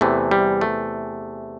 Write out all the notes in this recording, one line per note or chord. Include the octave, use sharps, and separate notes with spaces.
E2 C3 E3 A3
G3
A3